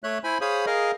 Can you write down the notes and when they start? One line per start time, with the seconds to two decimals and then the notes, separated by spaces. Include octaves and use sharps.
0.04 A3 C#5 E5 F#6
0.24 E4 C5 G#5 B5
0.41 G#4 C5 C#5 F5 B5 D#6
0.66 G#4 A#4 D#5 F5